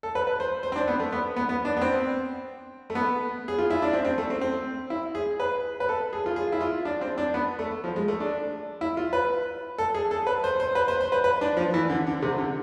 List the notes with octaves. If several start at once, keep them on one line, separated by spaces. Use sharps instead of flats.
A4
B4
B4
C5
C5
C4
D4
B3
A3
B3
B3
B3
D4
B3
C4
A3
B3
G#4
F4
E4
D4
C4
C4
A3
C4
C4
E4
G#4
B4
B4
A4
G#4
F4
G#4
E4
F4
D4
C4
D4
B3
A3
F3
G#3
A3
D4
E4
F4
B4
A4
G#4
A4
B4
C5
C5
B4
C5
C5
B4
B4
D4
F3
E3
D3
D3
C3
D3